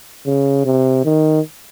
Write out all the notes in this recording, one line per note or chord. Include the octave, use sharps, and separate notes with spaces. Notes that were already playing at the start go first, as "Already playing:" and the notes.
C#3
C3
D#3